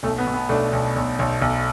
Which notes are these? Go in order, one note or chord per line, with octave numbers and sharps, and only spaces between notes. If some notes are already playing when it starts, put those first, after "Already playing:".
B1 A3
B3
B2
B3
B1 A3 D4
B1
B1
B1
B1